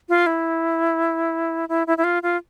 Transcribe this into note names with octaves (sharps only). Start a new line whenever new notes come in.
F4
E4
E4
E4
E4
F4
F4